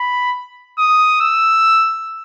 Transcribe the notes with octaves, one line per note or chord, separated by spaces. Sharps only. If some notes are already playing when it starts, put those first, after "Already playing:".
Already playing: B5
D#6
E6